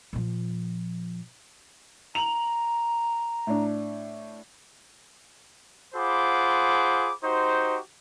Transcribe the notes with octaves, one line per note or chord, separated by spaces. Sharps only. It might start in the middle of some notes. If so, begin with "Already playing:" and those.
A#2 F3
A#5 F7 F#7
A2 D4
F4 G#4 C5 F#5 B5 D6
D#4 F#4 G4 C5